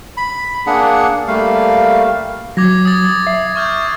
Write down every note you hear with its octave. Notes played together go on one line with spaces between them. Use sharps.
B5
A#3 D4 G#4 F#5
G3 A3 A#3 F5
F#3 D6 G#6 A#6
D#6 A6
E5 C7
C#6 F6 G6